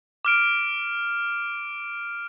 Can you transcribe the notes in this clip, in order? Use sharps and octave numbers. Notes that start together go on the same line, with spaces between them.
D6 F6 D7